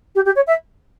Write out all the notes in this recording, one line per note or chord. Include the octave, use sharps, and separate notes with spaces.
G4
G4
C#5
E5